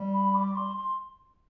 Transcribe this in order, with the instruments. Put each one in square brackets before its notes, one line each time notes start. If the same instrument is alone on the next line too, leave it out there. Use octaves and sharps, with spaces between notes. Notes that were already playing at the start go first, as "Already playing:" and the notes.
Already playing: [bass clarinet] G3
[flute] B5
D6
C6
C6